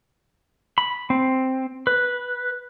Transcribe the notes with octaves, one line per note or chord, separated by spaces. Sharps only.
B5
C4
B4